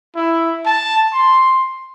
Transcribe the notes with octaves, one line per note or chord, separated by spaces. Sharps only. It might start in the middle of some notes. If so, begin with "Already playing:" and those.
E4
A5
C6